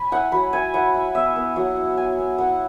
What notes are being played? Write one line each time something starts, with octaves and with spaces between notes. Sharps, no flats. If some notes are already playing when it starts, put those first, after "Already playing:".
Already playing: G#5 B5
E4 F#5
F#3 B5
E4 G#5
E4 F#5
E4
B3 E5
B3
F#3 F#5
E4
E4 G#5
B3
E4 F#5